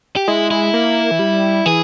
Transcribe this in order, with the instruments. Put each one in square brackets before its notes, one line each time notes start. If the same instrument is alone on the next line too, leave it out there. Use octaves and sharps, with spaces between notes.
[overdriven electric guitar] G4
[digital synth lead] G#3 [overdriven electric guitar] E4
[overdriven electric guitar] E4
[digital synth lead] A#3
E3
G3
[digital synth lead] E3 [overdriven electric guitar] G#4